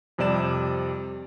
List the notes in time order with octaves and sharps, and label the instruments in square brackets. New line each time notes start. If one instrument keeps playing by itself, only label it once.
[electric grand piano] F2 C3 G3 D5 E7